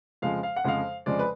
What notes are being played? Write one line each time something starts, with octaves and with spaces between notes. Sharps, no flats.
F2 C#3 F3 G#3 F5
F5
F#5
F2 C#3 F3 G#3 F5
F2 C#3 F3 G#3 D5
B4